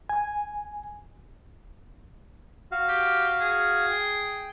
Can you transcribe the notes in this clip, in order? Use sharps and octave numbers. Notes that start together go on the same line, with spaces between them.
G#5
F#4 F5
G4
G#4
G5